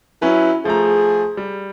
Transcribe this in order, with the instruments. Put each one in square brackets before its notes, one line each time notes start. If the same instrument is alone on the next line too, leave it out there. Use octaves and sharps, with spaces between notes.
[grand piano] F#3 C#4 B4 [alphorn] E4
[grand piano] F3 A3 A#5 [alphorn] G#4
[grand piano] G3